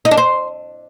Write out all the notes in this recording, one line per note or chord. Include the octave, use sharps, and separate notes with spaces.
D#4
D4
C5